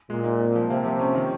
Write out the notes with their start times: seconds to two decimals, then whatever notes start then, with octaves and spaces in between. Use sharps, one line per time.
0.10 A#2 G#3
0.24 D#4
0.40 C4
0.56 F3
0.70 C3 A#3
0.85 F3
1.00 C#4
1.15 D#3